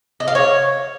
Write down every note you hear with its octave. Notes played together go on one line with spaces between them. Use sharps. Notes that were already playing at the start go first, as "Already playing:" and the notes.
D#5
F5
C#5